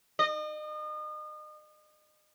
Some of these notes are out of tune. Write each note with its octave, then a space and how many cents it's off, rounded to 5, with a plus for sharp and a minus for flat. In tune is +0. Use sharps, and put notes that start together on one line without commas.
D#5 -35